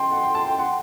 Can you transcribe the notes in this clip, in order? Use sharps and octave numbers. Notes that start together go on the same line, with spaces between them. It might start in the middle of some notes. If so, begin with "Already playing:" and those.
Already playing: G5 A5 C6
F#5
G5
A5
G5
F#5 C6